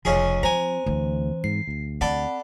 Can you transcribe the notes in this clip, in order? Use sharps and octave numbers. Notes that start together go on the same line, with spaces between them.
F1 C#2 F3 C#4 G#4
C4 C5 G#5 A#5
D2 E3 C4
G#2 C7
D2
C4 A4 D5 F#5 B5